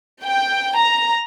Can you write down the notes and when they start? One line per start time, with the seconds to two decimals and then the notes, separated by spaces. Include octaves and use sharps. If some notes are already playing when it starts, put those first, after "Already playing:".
0.24 G5
0.78 A#5